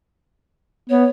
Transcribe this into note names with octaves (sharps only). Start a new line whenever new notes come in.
B3 C#5